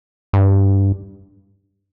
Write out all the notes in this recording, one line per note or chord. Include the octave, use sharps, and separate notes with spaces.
G2